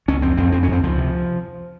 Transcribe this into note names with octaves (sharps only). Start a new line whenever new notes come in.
C#2 C#4
F2 C4
F2 C4
F2 C4
C#4
F2 C4
C#2 F3
C3